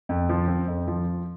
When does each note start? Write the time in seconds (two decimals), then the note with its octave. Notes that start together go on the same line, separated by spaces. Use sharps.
0.09 F2
0.29 F3
0.48 C4
0.68 F2
0.88 F3